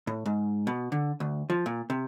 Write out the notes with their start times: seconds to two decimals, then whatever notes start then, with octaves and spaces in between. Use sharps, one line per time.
0.07 A2
0.26 G#2
0.67 B2
0.92 D3
1.20 D2
1.50 F3
1.66 A#2
1.90 C3